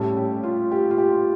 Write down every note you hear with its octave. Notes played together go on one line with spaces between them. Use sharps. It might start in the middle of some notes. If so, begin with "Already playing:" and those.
Already playing: A2 G3 C#4 A4
G4
F4
G4
F4
G4